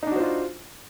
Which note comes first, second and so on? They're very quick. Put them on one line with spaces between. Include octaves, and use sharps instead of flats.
D#4 D4 F#4 C5 F4